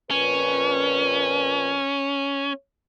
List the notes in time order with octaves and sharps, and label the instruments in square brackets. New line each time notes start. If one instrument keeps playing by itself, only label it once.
[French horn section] F2 A#2 B4 [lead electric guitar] C#4